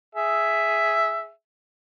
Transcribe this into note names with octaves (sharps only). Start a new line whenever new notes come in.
G#4 E5